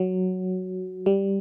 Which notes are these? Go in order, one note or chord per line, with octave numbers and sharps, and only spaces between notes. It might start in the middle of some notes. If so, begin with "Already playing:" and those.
Already playing: F#3
G3